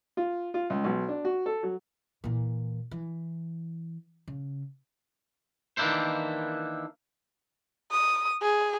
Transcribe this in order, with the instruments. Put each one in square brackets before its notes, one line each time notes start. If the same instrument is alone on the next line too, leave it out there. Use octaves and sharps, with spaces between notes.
[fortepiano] F4
F4
C#2
B1
D4
F#4
A4
F#3
[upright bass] A#2 E3
E3
C#3
[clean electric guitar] D#3 E3 A#3 D4 E4 C5
[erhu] D#6
G#4